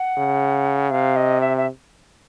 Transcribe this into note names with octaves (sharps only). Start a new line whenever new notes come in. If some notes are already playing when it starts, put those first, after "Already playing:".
Already playing: F#5
C#3
C3 F5
D#5
E5
E5